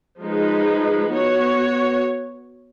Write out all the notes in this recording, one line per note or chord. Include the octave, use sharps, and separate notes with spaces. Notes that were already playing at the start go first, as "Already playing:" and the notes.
F3 G#3 D#4 G#4 B4
B3 F#4 C#5